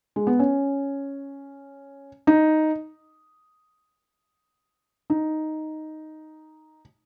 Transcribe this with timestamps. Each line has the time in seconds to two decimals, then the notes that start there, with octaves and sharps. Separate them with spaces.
0.16 G#3
0.27 B3
0.39 C#4
2.27 D#4
5.10 D#4